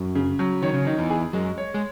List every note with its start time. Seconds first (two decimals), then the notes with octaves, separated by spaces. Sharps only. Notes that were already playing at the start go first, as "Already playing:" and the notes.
Already playing: F#2 F#3
0.15 C#3
0.39 F#3
0.63 D#3 C#5
0.74 C#3
0.85 D#3 D#4
0.98 E2 E3
1.10 G#4
1.33 F#2 F#3 G#3
1.58 C#5
1.74 G#3